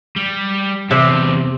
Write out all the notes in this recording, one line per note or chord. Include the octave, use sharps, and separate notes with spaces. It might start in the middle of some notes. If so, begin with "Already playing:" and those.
G3
E2 C3 C4